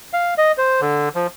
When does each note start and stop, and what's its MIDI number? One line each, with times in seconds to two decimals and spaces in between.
0.13 0.34 77
0.38 0.52 75
0.58 0.81 72
0.81 1.09 50
1.15 1.27 53